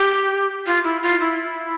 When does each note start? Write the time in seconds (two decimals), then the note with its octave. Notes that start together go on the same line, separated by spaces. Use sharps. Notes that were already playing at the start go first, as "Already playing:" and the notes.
Already playing: G4
0.67 F4
0.85 E4
1.03 F4
1.21 E4